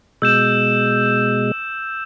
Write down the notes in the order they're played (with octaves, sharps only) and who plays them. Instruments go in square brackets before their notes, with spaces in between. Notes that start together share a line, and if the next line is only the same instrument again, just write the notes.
[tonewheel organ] B2 G#3 [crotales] E6 G6 E7